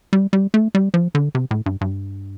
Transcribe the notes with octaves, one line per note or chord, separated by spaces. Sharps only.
G3
G3
A3
G3
F3
D3
C3
A2
G2
G2